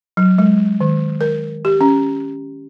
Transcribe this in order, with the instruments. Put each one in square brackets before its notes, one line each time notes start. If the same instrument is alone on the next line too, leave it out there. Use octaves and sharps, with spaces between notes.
[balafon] F#3
G#3
D#3
A#4
G4
C#4